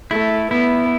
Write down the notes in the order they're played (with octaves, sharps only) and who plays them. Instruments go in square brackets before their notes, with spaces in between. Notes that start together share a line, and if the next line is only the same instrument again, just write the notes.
[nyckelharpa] A3 [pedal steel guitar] E4
[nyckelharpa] B3 [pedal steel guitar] E4